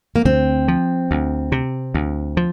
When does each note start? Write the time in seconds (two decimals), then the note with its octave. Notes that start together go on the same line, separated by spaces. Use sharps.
0.16 A#3
0.25 D2 C4
0.68 F3
1.11 D2
1.52 C3
1.94 D2
2.37 F3